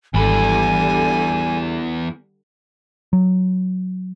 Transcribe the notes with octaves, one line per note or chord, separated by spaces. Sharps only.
G#1 E2 D3 G3 G#5 B5
F#3